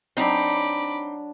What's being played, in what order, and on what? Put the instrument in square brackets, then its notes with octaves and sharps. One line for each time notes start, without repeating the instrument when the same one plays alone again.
[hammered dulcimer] F#3 D4 [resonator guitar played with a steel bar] C4 D#4 [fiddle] B5 D6